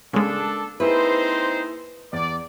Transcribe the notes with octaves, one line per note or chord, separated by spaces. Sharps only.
C#3 G#3 A#3 D4 A4
A#3 C4 D#4 E4 G#4 B4 C5
E2 D5